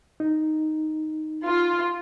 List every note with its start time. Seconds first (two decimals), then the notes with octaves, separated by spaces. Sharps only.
0.20 D#4
1.46 F4